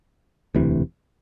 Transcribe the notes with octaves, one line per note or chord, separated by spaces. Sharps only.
E1 D2 C3 E3